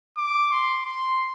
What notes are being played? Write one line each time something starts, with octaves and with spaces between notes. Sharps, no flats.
D6
C6
C6